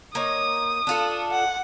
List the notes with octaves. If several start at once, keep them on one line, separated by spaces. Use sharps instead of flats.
A#3 D#4 C#5 D#6
D4 F4 A4
F#5